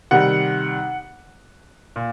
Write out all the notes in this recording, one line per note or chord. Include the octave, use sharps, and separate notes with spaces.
C3 D#3 G3 F#5
A#2